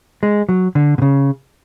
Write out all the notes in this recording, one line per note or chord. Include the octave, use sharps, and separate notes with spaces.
G#3
F#3
D3
B2
C#3